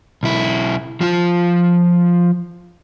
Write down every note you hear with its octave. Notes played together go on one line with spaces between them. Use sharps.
B1 E4
F3 F4